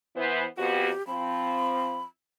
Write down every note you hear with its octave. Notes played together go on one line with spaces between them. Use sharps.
E3 B3 C5
F2 B3 F#4 G4
F3 C4 B5